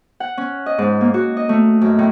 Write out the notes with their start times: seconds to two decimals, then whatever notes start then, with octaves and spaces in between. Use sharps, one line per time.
0.20 F#5
0.38 C#4
0.66 D#5
0.78 G#2
1.01 A#3
1.14 F#4
1.37 D#5
1.49 A3
1.81 F#2
1.99 A2